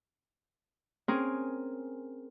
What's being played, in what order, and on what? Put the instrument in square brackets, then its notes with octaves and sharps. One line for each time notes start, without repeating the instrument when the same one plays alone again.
[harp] C4 C#4 G#4 A#4